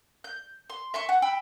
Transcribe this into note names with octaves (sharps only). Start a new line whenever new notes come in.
G6
C6
E5 C6 C#6
F#5
G5 B5 E6